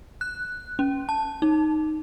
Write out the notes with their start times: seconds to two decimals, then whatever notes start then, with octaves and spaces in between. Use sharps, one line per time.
0.21 F#6
0.79 C#4
1.09 A5
1.42 D#4